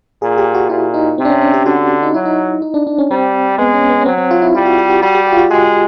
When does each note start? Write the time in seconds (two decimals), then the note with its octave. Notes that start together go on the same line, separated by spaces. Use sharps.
0.22 A#2 G#4
0.38 G4
0.54 F#4
0.70 A#2 E4
0.94 D#4
1.18 C3 C4
1.25 D4
1.30 C#4
1.42 D4
1.54 G4
1.66 D3 F#4
2.03 D#4
2.14 F#3 E4
2.25 D#4
2.62 D#4
2.74 D4
2.87 D4
2.98 C#4
3.11 G3 C4
3.58 G#3 B3
3.74 C#4
3.90 B3
4.01 C#4
4.06 F#3 C4
4.18 C4
4.31 F4
4.42 E4
4.55 G3 F4
4.66 F#4
4.78 G4
4.90 F#4
5.02 G3 F#4
5.15 G4
5.27 F#4
5.33 F4
5.38 F#4
5.50 G#3 G4